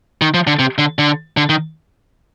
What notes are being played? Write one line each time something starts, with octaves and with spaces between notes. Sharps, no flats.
D#3
F3
D3
C3
D3
D3
D3
D#3